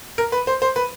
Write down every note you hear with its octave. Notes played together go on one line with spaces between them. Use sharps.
A#4
B4
C5
C5
B4